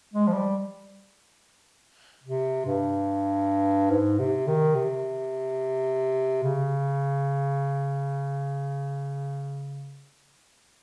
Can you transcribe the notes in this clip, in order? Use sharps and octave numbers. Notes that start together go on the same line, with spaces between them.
G#3
F3
G3
C3
G2
G#2
C3
D#3
C3
C#3